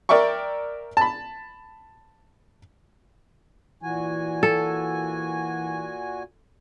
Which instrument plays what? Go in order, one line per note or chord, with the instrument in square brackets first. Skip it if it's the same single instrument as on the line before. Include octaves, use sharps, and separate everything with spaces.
[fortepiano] A#4 D5 E5 G5 C#6
A5 B5
[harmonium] A#2 F#4 G#5 [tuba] E3
[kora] A4